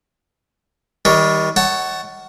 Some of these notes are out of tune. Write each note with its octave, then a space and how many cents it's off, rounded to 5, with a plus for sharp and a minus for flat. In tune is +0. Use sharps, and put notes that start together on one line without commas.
D#3 +30 G3 +0 C#5 +0
C#5 +0 F#5 +20 A5 +0